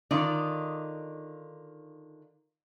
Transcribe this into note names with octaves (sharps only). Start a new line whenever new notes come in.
D3 D#3 D#4 F4 D5